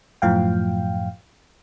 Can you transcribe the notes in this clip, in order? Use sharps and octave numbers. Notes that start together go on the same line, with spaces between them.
F#2 A2 F3 F5 G5